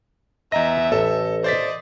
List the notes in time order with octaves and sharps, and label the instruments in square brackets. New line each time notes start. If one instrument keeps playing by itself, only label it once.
[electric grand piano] E2 A#5 A#6 [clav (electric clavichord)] D#5 [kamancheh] E5
[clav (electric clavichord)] A1 [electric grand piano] A4
[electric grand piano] C5 A6 B6 [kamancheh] D5 D#5